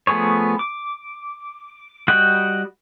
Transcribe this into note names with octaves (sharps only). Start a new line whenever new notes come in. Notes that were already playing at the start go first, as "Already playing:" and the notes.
F3 A3 B3 G#4 C#5
D6
G3 F#4 D#5 F#5 G5